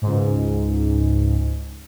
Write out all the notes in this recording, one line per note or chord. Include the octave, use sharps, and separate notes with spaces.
C#2 G#2